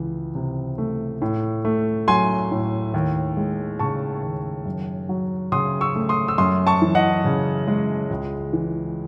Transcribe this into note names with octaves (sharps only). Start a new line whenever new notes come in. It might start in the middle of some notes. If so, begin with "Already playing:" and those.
Already playing: C#2 E3
C3
A3
A2
A3
F#3 G#5 C6
A2
D#2
G#3
C#3 A5 C#6
D#2
F#2
F#3
C#3 C6 D#6
C#6 E6
A3
C6 D#6
E6
F#2 C6 D#6
A5 C#6
E3
D#5 F#5
C#3
G#3
C#2
E3